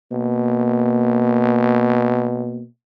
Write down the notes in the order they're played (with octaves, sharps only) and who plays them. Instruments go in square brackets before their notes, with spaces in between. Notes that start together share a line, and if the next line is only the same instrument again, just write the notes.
[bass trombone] B2 [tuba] A#3